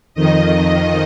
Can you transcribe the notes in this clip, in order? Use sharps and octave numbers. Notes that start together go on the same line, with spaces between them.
F2 D#3 D#5